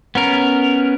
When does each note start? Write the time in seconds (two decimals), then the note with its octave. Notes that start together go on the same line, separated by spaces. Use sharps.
0.15 B3 C#4 A#4